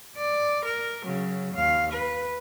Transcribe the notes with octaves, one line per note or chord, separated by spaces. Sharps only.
D5
A#4
C#3 F#3
D#2 F5
B4